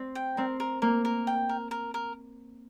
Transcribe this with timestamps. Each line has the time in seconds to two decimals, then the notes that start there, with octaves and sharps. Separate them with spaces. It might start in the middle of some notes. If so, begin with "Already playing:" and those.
Already playing: C4
0.15 G5
0.37 C4 A#4
0.60 A#4
0.82 A#3 A#4
1.05 A#4
1.27 G5
1.49 A#4
1.71 A#4
1.94 A#4